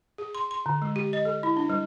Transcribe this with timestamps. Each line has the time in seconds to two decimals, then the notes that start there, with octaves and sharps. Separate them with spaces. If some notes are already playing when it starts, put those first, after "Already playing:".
0.18 G#4
0.35 C6
0.51 C6
0.66 D3
0.82 G#3
0.96 G4
1.13 D#5
1.25 A4
1.43 E4
1.57 D4
1.70 G3